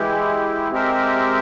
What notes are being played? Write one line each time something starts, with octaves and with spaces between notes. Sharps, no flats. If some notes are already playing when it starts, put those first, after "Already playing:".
Already playing: E3 G#3 E4 G4
G#3 C4 G4 A#4 E5